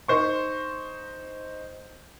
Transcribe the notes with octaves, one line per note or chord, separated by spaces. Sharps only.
D#4 C5 C#6